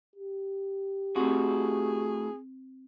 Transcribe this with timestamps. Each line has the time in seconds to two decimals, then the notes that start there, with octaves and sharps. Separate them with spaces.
0.16 G4
1.16 A2 C4 F#4 G#4